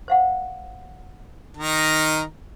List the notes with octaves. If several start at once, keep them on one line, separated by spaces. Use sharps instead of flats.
C5 F5 F#5
D#3 D#4 A#5